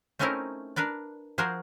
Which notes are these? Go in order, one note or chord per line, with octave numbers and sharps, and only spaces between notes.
A3 C4 C#4 D#4 E4 A#4
D4 A#4 B4 D5
F3 F#4 G#4 A#4 C5 G#5